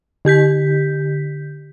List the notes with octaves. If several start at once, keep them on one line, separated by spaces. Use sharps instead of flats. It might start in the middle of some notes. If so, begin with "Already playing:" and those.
D3 G4 G6 B6